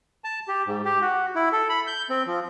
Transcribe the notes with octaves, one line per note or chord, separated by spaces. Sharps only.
A5
G4
G#2
G4
F#4
E4
A4
B5
G6
C4
F3